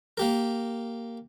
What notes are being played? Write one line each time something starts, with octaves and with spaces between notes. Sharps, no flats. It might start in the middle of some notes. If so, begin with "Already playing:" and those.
A#3 G4 A#4